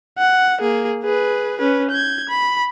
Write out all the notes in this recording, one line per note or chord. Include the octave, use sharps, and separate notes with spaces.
F#5
A#3 G#4
G#4 B4
C#4 B4
G6 G#6
B5